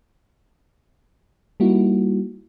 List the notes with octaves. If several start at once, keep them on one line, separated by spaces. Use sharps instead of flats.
G3 A#3 D#4 E4 F#4